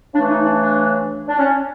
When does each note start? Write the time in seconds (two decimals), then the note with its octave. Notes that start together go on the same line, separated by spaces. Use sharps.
0.14 C#3 E3 A3 D4
0.29 D#4
0.45 D4
0.60 D4
1.28 D4
1.39 C#4